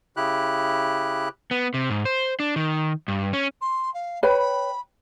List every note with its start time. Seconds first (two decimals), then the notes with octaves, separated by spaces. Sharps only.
0.17 C#3 E4 G4 F#6
1.51 B3
1.74 C3
1.90 G#2
2.05 C5
2.40 D4
2.56 D#3
3.08 G2
3.33 C#4
3.61 C6
3.94 F5
4.23 B4 C#5 G5 B5